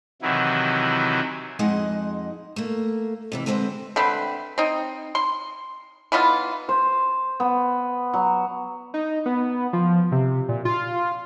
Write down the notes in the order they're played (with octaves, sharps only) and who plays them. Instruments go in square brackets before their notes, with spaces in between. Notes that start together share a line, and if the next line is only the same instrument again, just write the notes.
[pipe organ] C3 D#3 E3 F#3 E4
[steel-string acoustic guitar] F2 G#3 D#4 G#4 D#5 F#5
A3 A#3
F2 C3 E3
D3 G#3 B3 C4 B4 C5
[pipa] D3 A3 C4 B4
C4 D#4
C6
E3 B3 D#4 F4
[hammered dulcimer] C5
B3
F#3
[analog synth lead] D#4
B3
F3
C3
A#2
F4